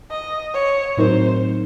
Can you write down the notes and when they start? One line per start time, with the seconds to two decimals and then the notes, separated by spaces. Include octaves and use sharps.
0.11 D#5
0.54 C#5
0.97 A2 F#3 C4 D#4 A#4 C5